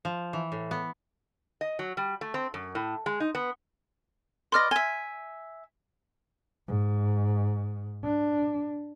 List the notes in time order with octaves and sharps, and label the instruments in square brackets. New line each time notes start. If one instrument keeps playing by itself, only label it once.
[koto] F3
E3
A2
B3
[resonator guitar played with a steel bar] D#5
F#3
G3
A3
C4
F#2
A2
G#3
D#4
B3
[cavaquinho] B4 D5 D#5 [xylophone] C6 F6 A#6
[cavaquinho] E5 G#5 [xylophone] G7
[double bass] G#2
D4